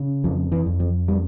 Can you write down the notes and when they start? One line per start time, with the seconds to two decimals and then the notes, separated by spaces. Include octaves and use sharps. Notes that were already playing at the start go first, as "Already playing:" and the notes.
Already playing: C#3
0.24 F2 F3
0.52 E3
0.66 F2
0.80 F3
1.08 G3